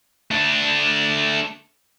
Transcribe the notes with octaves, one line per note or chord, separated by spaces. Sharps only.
A3 D4